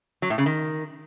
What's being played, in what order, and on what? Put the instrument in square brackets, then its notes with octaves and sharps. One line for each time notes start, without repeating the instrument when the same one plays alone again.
[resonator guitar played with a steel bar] F#3
A2
C#3
D#3